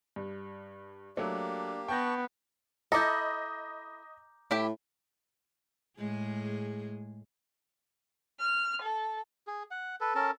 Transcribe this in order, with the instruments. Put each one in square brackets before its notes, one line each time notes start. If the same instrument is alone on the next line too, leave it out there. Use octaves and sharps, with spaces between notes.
[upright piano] G2
[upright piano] F#3 A3 [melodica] A#3 G4 [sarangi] D4
[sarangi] B3 [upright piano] G5 G6 A#6 [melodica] A5 C#6
[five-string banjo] E4 A4 [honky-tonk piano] D#5 [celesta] A#5 D6 G6
[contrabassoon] A2 [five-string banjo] E4 G4 G5
[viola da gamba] A2 G#3 G#4
[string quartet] F6
A4
[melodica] G#4
F#5
A4 B4
C#4 A4 A#4 A5